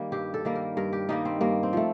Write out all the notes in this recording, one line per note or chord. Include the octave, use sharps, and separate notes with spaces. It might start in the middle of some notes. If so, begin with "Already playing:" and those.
Already playing: D#3 G3 A#3
G2 G4
A4
D#3 G3 A#3
A#4
G2 A#4
G4
D#3 G3 A#3 D#4
C4
G2 A#3
C4
F3 A3